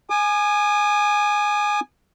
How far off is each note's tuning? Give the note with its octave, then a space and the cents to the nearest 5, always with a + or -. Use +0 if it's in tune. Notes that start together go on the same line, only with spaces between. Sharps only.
G#5 +0 D#6 -45